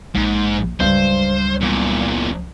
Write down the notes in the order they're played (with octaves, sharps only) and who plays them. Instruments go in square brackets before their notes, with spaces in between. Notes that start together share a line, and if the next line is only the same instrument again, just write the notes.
[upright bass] A#1 [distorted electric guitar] G#2
[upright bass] C#2 F#3 [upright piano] G2 [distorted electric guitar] C5
[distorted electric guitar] E2 A#2